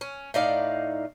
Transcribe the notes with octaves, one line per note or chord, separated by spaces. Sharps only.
C#4
A2 D#4 D5 F5